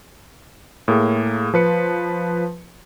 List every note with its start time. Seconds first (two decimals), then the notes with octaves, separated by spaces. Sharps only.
0.88 A2 A#3 G#4
1.54 F3 B4 C#7